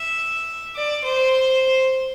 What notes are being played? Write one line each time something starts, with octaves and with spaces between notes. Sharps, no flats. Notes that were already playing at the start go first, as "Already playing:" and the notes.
Already playing: E5
D5
C5